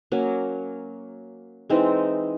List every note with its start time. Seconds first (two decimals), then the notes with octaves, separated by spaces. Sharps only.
0.12 F#3 A#3 C#4
1.70 E3 G#3 C4 D#4